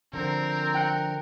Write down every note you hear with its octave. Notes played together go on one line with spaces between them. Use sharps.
D3 F3 C4 A#4
G5 F#6 C#7